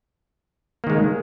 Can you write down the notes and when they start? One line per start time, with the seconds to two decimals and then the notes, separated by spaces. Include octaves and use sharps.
0.84 A#3
0.87 D#3
0.90 G#3